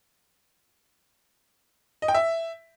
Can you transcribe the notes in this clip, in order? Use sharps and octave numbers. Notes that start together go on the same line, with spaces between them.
D#5
G5
E5